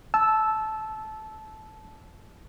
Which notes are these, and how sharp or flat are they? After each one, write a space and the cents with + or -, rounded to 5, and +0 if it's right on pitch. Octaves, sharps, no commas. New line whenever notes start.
A5 -20 E6 +0